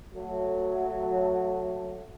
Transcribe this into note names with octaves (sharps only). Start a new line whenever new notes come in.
F#3 A3